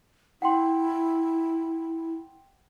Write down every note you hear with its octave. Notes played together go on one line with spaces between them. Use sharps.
E4 F#5 G5 C6